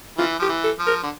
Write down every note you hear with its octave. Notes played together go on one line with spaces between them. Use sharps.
E3 F4
F3 G4
E3
A4
F3
A#4
D3